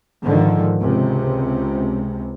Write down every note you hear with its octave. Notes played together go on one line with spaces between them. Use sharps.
G#2 D3 D#3 F3
C#2 C3